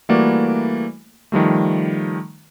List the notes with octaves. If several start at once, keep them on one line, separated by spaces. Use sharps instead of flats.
E3 G3 A3 A#3 F#4 D5
D#3 F3 G3 A3